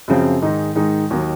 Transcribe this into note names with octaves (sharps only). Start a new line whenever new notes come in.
F#2 C#3 F3 C4
G#2 D#3 G#3 D#4
G#2 D#3 G#3 D#4
D#2 D#3 F#3 A#3